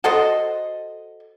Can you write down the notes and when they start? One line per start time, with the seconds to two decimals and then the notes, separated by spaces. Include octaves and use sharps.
0.04 F#4 A4 C5 D#5